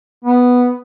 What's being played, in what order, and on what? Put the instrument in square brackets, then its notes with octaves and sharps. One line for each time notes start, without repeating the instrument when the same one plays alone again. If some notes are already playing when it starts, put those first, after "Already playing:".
[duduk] B3